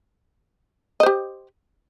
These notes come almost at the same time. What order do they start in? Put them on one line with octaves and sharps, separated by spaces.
D#5 C5 G4